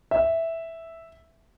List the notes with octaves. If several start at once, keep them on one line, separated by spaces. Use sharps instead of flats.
E5